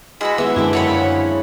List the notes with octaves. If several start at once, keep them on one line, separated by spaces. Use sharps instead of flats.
G#3 E4 F#4 B5
E3 G#3 B3 E6
F#2 D3 G#3 C4 D4 E4
A4 C#5 F#5 B5
C#3